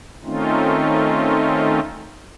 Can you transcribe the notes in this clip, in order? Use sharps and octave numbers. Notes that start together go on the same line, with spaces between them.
D#3 A3 C4 C#4 D#4 F4